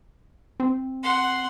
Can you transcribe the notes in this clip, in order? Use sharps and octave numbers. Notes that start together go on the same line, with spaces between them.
C4
F#5 C6